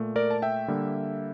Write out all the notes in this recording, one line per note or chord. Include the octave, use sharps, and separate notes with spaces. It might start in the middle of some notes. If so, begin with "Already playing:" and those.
Already playing: A#2 A3
A#4 D5
A5
E5 G5
D3 G3 A#3